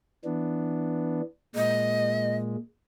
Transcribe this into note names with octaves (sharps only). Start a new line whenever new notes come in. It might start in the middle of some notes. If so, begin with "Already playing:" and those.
E3 B3 D4
A#2 G#3 D#5